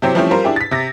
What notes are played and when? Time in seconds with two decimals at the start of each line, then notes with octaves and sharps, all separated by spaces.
0.02 C3 F#3 C4 E4 G4
0.14 E3 F3 G3 A3 C4 C#4
0.31 G3 F4 A#4 C5
0.44 D4 E4 G4 G#4
0.56 A6 B6
0.71 C3 A#6